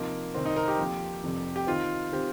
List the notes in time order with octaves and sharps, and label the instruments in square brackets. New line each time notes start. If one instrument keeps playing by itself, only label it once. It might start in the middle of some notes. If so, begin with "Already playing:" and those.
Already playing: [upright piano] C3 F3 D#4 [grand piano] A#3
[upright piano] C2 C3 D#3 [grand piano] C4
[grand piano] D#4
A#4
G4
[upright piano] F2 F3 A#3
F1 F2 C3 F3
[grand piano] G4
[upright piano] D#3 C4 D#4 C5 [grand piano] F4
[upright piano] D#3 C4 G4 C5